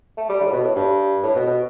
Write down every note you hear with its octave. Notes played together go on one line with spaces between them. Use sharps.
A3
G3
D3
A2
B2
A2
G2
A2
B2
B2